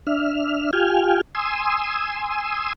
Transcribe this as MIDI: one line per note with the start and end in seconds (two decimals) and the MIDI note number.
0.07 0.71 62
0.07 0.71 76
0.07 0.71 89
0.73 1.21 65
0.73 1.21 67
0.73 1.21 79
0.73 1.21 80
0.73 1.21 89
1.35 2.73 80
1.35 2.73 84
1.35 2.73 87
1.35 2.73 88